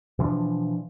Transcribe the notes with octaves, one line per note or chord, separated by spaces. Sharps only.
B2 E3 F3 D4